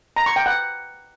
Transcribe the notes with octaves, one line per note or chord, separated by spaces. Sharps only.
A#5
C#6
G5
F#5